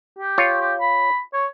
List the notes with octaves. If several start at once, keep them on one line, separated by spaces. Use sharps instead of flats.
G4
F4 C#5
G4
B5
C#5